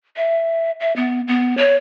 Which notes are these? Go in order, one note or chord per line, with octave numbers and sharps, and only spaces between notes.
E5
E5
B3
B3
C#5